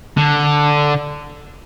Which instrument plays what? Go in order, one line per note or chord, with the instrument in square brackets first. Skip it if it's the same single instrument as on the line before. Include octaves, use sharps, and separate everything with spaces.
[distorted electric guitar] D3